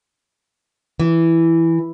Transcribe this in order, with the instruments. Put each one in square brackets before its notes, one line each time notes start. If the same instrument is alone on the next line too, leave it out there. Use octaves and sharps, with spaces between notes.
[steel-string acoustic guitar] E3